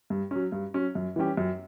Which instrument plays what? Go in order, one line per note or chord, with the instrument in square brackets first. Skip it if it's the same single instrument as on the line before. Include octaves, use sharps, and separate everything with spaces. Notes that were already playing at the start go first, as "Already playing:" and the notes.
[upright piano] G2
F#3 C#4
G2
F#3 C#4
F#2
E3 G3 C#4 G4
F#2